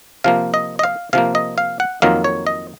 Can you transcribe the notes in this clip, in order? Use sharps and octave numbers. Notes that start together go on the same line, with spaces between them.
C3 F3 A#3 F5
D#5
D#5
F5
C3 F3 A#3 F5
D#5
F5
F#5
F2 D#3 F#3 A#3 F5
C#5
D#5